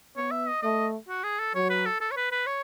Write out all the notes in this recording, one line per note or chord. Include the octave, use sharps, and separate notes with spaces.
B3 C#5
E5
D#5
A3 D#5
F#4
G#4
A4
F#3 C#5
B4
A4
A4
C#5
B4
B4
C#5